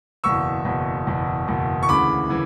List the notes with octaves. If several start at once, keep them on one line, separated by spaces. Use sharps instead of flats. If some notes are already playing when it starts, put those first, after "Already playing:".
F#1 E2 B2 C#6 E6
F#1 E2 B2
F#1 E2 B2
F#1 E2 B2
C#6
D2 C#3 E3 B5 D6
C#3 E3